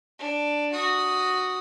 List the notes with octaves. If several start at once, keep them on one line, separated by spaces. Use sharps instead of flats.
D4
F#4 D#6